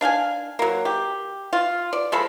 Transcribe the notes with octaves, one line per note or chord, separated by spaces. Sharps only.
D4 F5 G5 G#5
F#3 A#3
G4
F4
D5
F3 G#3 A4 B5